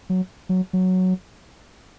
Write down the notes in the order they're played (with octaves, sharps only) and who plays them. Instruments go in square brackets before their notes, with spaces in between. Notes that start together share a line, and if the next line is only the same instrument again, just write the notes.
[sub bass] F#3
F#3
F#3